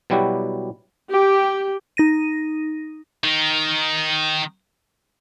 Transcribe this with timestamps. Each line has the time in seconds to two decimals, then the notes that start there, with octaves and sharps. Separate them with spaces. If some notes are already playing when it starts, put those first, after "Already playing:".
0.10 B2 F#3 G3 E4 F#4 G4
1.10 G4
1.97 D#4 A#6 D#7
3.24 D#3 D#4